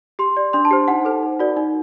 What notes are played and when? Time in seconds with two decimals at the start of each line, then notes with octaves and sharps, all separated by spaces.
0.19 G4 C6
0.37 D5
0.53 D4 C6
0.65 A5
0.71 G4 C5
0.88 D#4 F#5
1.05 A4 C5
1.23 D#4
1.39 F#4 A#4 D5
1.57 D#4